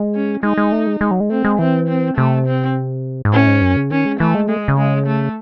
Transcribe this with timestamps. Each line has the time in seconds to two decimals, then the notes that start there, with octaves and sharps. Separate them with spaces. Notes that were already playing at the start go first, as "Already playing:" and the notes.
Already playing: G#3
0.15 C#4
0.43 G#3 D#4
0.58 G#3
0.72 A3
0.87 G#3
1.01 G#3
1.11 F#3
1.20 G#3
1.30 A3 C4
1.44 G#3
1.59 E3 C4
1.88 C4
2.17 C3 A3
2.47 C4
3.25 G#2
3.33 A2 C#4
3.47 G#2
3.62 F#2
3.76 C#3
3.91 D#3 C#4
4.05 G#3
4.20 E3 A3
4.35 G#3
4.48 G#3 A3
4.68 C#3
4.78 G#3
5.07 A3